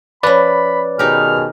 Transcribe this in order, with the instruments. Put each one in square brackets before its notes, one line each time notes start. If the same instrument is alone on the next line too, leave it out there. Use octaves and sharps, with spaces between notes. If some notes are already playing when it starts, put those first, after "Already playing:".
[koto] F3 C#4 [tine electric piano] B4 D5 [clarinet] B5
[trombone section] B2 D#3 G#4 [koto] D#4 G4 [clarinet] F6